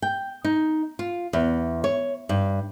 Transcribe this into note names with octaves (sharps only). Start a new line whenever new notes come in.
G5
D#4
F4
E2
C#5
G2